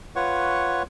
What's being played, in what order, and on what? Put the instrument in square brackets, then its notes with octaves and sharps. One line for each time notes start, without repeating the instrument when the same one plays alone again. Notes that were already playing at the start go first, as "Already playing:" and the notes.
[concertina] F4 B4 C#5 F#5 C#6